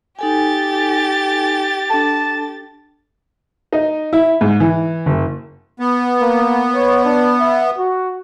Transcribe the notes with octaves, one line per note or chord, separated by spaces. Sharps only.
D#4 G4 A4 G#5 A6
D4 A4 A5
D#4
E4
G#2
E3
F#1
B3
A#3
C#5
D4
E5
F#4